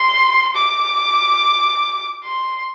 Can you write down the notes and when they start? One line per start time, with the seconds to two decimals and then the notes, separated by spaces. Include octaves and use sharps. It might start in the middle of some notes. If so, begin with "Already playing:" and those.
Already playing: C6
0.55 D6
2.23 C6